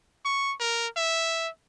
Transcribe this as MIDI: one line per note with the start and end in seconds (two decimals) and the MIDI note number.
0.25 0.54 85
0.60 0.87 70
0.97 1.49 76